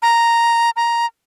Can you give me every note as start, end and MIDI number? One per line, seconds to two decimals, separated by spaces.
0.02 0.70 82
0.76 1.06 82